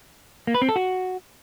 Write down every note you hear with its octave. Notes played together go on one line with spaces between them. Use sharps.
A#3
B4
C4
A4
F#4